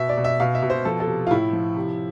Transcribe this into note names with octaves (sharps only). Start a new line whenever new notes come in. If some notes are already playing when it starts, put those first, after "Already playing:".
Already playing: B2 E5
D5
B2
E5
B2 F5
E5
B2
C5
F3 A4
A4
C3
F4
A2 E4
F3
C3